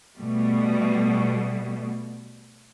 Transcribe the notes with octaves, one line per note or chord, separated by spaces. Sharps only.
B2 G3 A3